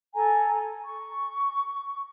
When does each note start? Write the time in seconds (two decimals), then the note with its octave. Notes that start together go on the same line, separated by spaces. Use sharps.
0.15 A4 G#5 A#5
0.85 C#6